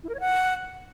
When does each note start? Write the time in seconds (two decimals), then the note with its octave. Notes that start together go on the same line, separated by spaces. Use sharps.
0.04 E4
0.09 A#4
0.14 C#5
0.20 F#5